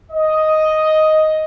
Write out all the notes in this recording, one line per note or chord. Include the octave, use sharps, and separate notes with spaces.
D#5